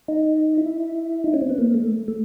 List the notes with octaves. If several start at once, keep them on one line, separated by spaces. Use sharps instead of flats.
D#4
E4
D#4
C#4
C4
B3
A#3
A3
A3